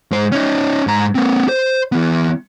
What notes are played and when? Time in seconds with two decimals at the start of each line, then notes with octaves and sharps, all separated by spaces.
0.11 G#2 C5
0.32 C#4 D#4
0.87 G#2 A#5
1.15 A#3 C4
1.49 C5
1.92 E3 B3